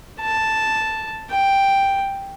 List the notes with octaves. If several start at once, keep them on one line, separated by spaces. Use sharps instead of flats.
A5
G5